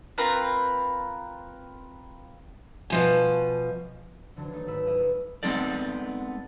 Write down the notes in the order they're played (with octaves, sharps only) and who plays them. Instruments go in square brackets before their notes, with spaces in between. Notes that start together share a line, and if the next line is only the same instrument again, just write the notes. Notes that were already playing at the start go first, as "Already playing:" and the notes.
[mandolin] C4 F4 A#4 B4
[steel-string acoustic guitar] B2 F3 G#5
[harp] F1 D3 E3 F#3 A5 A#6
D#3 F#3 A3 D#4
D#1 G#2 A3 B4 E6
E4 F4 G4 B4 D#5 E5
F#1 D#4
[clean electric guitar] G#3 B3 C4 D#4 A4 D5